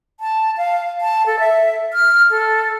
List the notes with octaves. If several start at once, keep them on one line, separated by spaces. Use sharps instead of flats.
A5
F5
A5
A4
E5
F6
A4